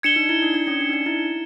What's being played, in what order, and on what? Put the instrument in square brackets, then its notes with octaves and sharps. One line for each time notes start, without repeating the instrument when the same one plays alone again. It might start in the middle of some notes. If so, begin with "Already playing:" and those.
[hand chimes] D4 [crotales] G#6 C#7 E7 G7
[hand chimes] D#4
E4
D4
D4
C#4
D4
D#4
D4
E4